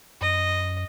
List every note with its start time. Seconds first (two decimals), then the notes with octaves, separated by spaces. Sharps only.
0.21 F#2 D#5